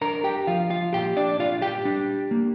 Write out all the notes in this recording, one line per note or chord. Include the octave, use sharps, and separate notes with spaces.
D4 A#4 A#5
G4 G5
F3 F4 F5
F4 F5
A#2 G4 G5
D4 D5
D4 F4 F5
G4 G5
D4
A#3